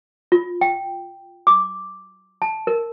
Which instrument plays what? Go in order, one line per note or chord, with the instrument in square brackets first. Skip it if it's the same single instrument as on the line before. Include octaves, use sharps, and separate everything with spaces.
[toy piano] F4
G5
D6
A5
A#4